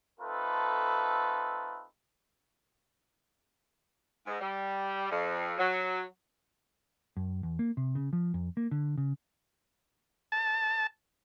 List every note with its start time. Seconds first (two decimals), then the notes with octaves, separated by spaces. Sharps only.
0.20 A3 C4 D#4 F4 A4 B4
4.26 G#2
4.40 G3
5.10 F2
5.58 F#3
7.17 F#2
7.43 E2
7.59 A#3
7.77 C3
7.95 C#3
8.13 F3
8.34 F2
8.57 A#3
8.71 D3
8.98 C#3
10.32 A5